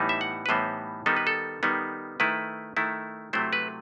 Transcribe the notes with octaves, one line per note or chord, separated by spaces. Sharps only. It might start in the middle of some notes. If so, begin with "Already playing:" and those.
Already playing: A2 E3 G3 B3 D#4
E5
F#5
B4
A2 E3 G3 B3 D#4 C5
D#3 G3 B3 D#4 A4
B4
A4
D#3 G3 B3 D#4
D#3 A3 E4 B4
D#3 A3 E4
C3 F#3 A3 E4 C5
B4